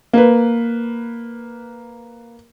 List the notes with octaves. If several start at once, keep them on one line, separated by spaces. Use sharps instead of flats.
A#3 B4